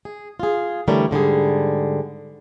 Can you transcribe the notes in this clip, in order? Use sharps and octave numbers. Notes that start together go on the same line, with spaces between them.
G#4
F4 G#4
D3 E3 G3 A3 A#4 C#5
G#2 D3 G3 G#4